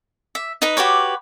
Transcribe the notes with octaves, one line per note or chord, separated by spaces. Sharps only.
E5
D#4 B4 D#5 A#5
F#4 G4 B4 C#5